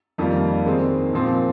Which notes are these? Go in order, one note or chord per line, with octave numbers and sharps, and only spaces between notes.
F2 D#3 G3 A#3 F4
D#3 G#3 C4
A#2 F3 C4